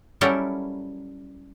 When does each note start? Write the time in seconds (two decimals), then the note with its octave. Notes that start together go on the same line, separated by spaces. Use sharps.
0.21 F#3 G3 C#4 E4 A4 A#4